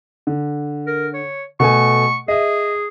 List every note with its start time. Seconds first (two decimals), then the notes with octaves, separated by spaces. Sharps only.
0.27 D3
0.87 A#4
1.14 C#5
1.60 B2 A3 G#5 C#6
2.28 G#4 D#5 E5